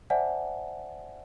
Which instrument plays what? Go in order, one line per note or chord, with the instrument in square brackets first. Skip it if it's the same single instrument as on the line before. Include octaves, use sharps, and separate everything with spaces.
[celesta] C5 D5 E5 F#5 G#5 A5